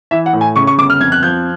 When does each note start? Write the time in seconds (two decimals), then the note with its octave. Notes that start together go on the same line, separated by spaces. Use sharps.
0.11 E3 E5
0.26 F#5
0.33 A2
0.41 G#5
0.56 C#3 C#6
0.67 C#6
0.78 G1 D6
0.90 F6
1.01 F2 G#6
1.12 F#6
1.23 F3 G6